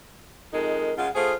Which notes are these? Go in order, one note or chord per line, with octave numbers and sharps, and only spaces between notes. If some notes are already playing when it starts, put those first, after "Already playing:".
F2 G#3 D#4 A#4
C#3 G#3 F4 F#5
A3 F4 G#4 C5